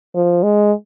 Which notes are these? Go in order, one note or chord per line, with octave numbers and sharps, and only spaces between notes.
F3
G#3